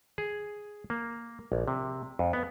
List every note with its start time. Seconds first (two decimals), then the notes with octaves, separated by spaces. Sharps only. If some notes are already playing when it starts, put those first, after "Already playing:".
0.18 G#4
0.90 A#3
1.52 A#1
1.68 C3
2.19 F2
2.33 B3